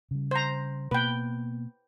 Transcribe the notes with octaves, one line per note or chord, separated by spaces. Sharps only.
C#3 G3
C5 A#5
B2 A#3 B3 B4 G5